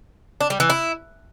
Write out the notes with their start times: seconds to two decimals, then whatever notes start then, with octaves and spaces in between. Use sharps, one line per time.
0.41 D4
0.50 G3
0.60 E3
0.70 E4